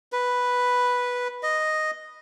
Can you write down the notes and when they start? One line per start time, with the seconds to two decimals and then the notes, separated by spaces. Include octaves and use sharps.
0.12 B4
1.43 D#5